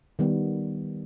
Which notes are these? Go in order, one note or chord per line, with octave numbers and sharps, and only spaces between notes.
D#3 G3 B3